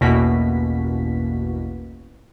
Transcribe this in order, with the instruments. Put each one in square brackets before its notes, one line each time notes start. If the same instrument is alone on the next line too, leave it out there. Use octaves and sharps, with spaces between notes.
[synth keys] A1 E2 B2 A#3 F#4 B6